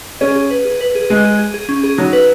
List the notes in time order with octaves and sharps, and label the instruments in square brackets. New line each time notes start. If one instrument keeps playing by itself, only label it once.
[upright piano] C#4 [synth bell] G#4
[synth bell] G#4
B4
G#4
B4
G#4
[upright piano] G#3 [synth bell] G#4
[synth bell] G#4
G#4
G#4
C#4
G#4
[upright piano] F#3 [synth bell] D#4
[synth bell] B4